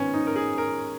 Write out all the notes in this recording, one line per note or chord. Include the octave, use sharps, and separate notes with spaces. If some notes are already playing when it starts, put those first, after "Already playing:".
Already playing: G#2 D#3 B3 C#4
D#4
A#4
G#4
A#4